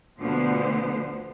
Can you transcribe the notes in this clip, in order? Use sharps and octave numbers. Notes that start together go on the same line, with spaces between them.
D2 B2 D3 F3 B3 C5